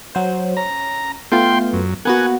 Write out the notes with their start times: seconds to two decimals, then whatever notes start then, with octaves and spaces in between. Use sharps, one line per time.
0.15 F#3 C5
0.57 C#4 A#5
1.32 A3 B3 F4 G5 C6
1.73 F#2
2.05 A#3 B3 F#4 F#5 G#5